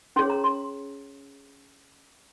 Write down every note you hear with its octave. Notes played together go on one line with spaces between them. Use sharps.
C#4 G#4 C#5 C6
A#5
C6